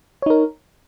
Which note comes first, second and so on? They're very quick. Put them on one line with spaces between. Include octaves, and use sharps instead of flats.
C#5 D#4 A#4